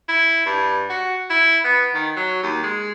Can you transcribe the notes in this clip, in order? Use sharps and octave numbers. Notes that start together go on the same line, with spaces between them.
E4
G2
F#4
E4
B3
D#3
F#3
D#2
G#3